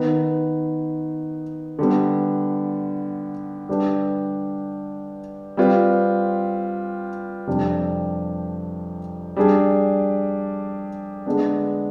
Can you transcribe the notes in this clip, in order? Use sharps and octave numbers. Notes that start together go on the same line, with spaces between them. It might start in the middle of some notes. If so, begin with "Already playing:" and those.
Already playing: D#3 B3 D#4 B4
D3 G3 B3
D3 G3 D4 G4 B4
G3 C4 F4 B4
F2 C3 G3 D4 G4
G3 D4 G#4
D3 G#3 B3 D4